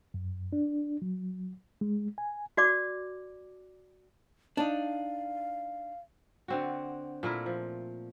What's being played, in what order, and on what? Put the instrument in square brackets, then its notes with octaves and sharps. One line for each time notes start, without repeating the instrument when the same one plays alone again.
[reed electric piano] F#2
D4
F#3
G#3
G#5
[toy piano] F#4 D5 D6
[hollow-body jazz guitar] D4 D#4 [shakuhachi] F5
[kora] D3 C4 F#4
A#2 A3 E4 A#4
F3